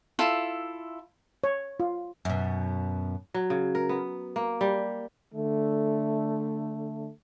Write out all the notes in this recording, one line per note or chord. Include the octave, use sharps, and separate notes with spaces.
E4 F4 A4
C#5
F4
F#2 B2
F#3
C#3
A#4
B3
A#3
G3
D3 A3